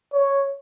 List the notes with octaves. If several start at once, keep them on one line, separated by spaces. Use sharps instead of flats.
C#5